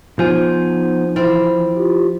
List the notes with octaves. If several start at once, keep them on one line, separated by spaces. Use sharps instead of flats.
F3 B3 D#4 C5 G#5
E3 C4 E4
F4 G4